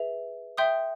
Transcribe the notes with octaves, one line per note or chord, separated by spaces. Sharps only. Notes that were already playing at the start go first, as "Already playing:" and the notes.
Already playing: G#4 B4 E5
E5 G5 C6 D#6 G6